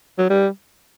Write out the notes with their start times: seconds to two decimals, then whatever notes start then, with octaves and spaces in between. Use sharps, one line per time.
0.18 F#3
0.30 G3